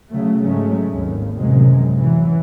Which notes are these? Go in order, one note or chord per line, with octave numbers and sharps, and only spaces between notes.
C#3 F#3 A3
G#2 F#3 G#3 A3 C#4
G#1 D#2
A1 F#2 C3 F#3 G#3
E3 F#3